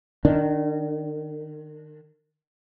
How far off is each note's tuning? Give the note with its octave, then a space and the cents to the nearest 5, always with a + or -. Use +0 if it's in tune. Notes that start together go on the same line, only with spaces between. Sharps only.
D#3 -30 D4 +0